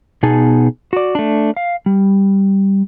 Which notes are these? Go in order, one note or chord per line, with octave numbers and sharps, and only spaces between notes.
B2 B3 D#4 G#4 G#5 A5
F#4 D5
A3 D4
F5
G3